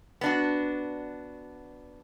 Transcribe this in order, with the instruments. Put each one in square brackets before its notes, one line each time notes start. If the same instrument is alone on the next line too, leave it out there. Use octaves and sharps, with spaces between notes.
[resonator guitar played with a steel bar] B3 D4 F#4